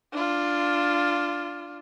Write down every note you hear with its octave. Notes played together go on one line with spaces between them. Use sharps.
D4 F4